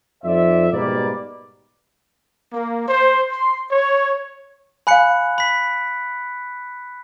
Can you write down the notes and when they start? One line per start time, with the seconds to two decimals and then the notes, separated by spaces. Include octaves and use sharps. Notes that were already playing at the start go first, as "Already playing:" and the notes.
0.24 F2 F3 D#4 C5 D5 E5
0.73 G#2 B2 G3 A#3 B4 D5
2.53 A#3
2.87 C5
3.31 C6
3.71 C#5
4.87 F5 G#5 B5 F#6 C#7
5.38 B5 B6